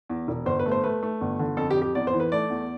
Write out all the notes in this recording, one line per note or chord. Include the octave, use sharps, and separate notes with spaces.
E2
E1
G1 C5
B4
A3
C5
A3 B4
A3
G1
D3
F2 A4
G4
F2
G4
E2 D5
C5
E3
B4
A3 D5
E2